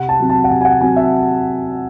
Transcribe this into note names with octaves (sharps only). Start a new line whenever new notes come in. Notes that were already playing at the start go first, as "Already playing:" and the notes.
Already playing: C3 F#5
A5
F#3 C4
A5
F#5
C3 G#5
G#5
F#5
F#3 C4 G#5
E5